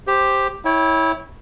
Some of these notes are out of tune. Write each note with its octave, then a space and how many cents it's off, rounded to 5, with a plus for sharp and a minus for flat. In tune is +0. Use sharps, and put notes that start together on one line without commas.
G4 +5 C5 +0
E4 -20 C#5 +0 G5 +0